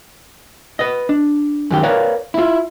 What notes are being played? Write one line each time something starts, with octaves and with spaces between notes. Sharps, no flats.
B4 D#5
D4
F#2 D#3 G4
A#4 B4 C#5 D5 F5
E4 F4